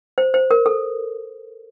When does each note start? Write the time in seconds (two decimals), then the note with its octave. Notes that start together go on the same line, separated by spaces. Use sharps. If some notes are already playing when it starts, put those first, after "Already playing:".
0.18 C5
0.34 C5
0.51 A#4
0.66 A4